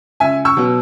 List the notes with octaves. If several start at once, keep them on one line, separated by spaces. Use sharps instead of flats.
C#2 E5 G#5
C#6 E6
B2 F#3 B3